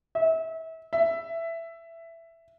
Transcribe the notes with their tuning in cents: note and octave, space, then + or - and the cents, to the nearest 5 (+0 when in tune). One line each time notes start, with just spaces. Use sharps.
E5 -30
E5 +10